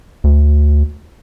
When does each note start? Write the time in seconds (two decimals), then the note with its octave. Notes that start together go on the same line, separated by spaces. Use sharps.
0.24 D2